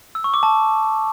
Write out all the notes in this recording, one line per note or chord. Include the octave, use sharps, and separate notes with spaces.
E6
C#6
D6
A5